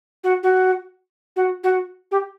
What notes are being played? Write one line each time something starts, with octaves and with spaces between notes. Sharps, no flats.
F#4
F#4
F#4
F#4
G4